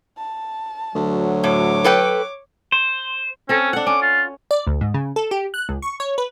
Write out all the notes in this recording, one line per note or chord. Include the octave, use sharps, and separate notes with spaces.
A5
D2 F#3
A2 C#5 D6
A4 B4 G5
C5
C4 C#4 A4
D4 F#5
C#4 D6
F4
D5
D2
G#2
C#3
A4
G4
F#6
C#2
C#6
C#5
B4